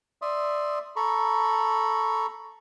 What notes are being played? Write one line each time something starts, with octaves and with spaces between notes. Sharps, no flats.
D5 E5 C6 D#6
A4 A#5 B5 C#6